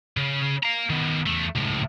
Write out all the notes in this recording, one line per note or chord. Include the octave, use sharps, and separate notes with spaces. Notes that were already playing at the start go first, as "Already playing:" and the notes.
C#3
F5 A#5
D#3 B3
E2 A3
C#2 A2